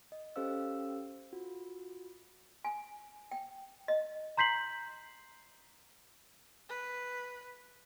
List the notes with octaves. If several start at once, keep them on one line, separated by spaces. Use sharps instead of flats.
D#5
C#4 G4 A4 C5 F5 E6
F4 F#4
G#5
G5
D#5
A#5 C6 G6 B6 C7 F#7
B4